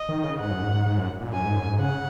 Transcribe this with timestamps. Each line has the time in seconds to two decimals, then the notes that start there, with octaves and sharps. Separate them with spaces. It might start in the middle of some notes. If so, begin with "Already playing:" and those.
Already playing: D#5
0.09 D#3
0.24 C#3
0.40 G#2 F#5
0.51 F#2
0.63 G#2
0.74 G#2
0.86 G#2
0.98 F#2
1.21 A#2
1.33 F#2 G#5
1.45 G#2
1.56 F#2
1.67 G#2
1.79 C#3 F#5